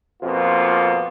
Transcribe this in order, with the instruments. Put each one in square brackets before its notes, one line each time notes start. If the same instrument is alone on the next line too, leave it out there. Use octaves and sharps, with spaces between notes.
[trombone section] F2 B2 A#3 F4